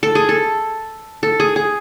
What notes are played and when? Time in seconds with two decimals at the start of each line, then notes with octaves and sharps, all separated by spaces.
0.03 A4
0.15 G#4
0.29 A4
1.23 A4
1.40 G#4
1.56 G#4